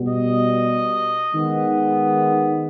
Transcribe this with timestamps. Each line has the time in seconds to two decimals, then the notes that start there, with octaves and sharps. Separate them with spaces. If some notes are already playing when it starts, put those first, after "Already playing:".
Already playing: B2 G3 B3
0.09 D#5
1.32 D#3 G#3 B3